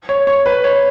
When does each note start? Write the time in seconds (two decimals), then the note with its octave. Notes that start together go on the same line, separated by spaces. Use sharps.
0.09 C#5
0.27 C#5
0.46 B4
0.64 C#5